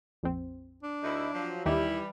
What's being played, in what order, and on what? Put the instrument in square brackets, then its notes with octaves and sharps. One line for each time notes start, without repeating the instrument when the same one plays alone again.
[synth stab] A#1 F2 C4
[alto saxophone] D4
[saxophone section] D2 D#4 E4
F3 F#3
[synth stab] D#2 D#3 G4 [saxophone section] E3 G3 [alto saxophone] E4